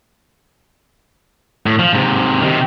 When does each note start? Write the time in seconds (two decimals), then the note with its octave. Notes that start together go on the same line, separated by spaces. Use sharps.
1.66 A2
1.79 F3
1.93 G#2 C3
2.41 C3 D#3